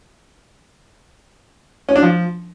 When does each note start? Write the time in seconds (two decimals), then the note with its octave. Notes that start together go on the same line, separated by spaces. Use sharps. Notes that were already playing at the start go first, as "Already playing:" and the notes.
1.89 C#4
1.96 D4
2.03 F3